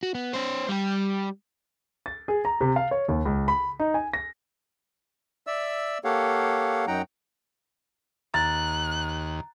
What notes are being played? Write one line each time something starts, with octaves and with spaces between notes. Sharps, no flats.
F#4
B3
C#4 C5
G3 G4
A6
G#4
A#5
C3
F5
C#5
D#2
C#2
B5
D#4
G#5
A#6
D5 E5 E6
A#3 G4 A4 C#5 F5 F#5
F#2 F#3 D#4 F#5 G5 A#5
D#2 A#5 F#6 A6